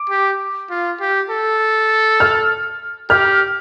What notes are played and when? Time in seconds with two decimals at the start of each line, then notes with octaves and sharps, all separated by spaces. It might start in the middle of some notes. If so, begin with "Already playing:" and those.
Already playing: D6
0.10 G4
0.70 F4
1.00 G4
1.30 A4
2.20 F6
3.10 G4 F6